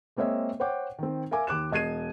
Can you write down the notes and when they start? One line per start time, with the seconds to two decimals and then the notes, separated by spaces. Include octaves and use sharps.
0.17 G#3 A#3 C4 C#5 D#5 E5
0.60 C5 C#5 F#5 G5 D6
0.98 D#3 C4
1.31 A#4 E5 F5 G#5 D6
1.47 D#2 D6 F#6 E7
1.71 E1 D#5 G#6 C7 D#7